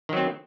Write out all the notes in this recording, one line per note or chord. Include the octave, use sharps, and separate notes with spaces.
D#3 F#3 C4